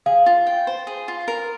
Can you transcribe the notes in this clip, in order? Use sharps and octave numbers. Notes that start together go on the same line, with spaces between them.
G#4 F5
F4
G5
C5
G#4
F4
A#4